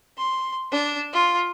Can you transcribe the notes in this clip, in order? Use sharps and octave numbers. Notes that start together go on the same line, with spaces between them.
C6
D4
F4